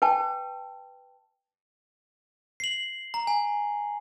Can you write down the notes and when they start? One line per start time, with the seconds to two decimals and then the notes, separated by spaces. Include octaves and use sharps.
0.02 B4 G5 A5
2.60 C7 F#7
3.14 A#5
3.27 G#5